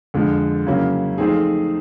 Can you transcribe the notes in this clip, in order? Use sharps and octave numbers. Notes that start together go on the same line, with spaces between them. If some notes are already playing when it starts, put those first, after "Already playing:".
F2 D3 F3 G#3
C#3 F#3 A#3 C#4 E4
F3 A3 C4 D#4 G#4